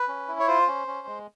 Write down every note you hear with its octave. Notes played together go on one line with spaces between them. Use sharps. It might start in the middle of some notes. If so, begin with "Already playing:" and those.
Already playing: B4
C#4
E4
C#5
F4 C5
C#4
C#4
G#3